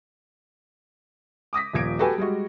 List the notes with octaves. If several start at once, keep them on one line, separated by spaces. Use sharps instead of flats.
D6 D#6 A#6 B6
D#1 F3 G#6 D7
F#4 G4 A4 B4 G5 G#5
G3 G#3 F#4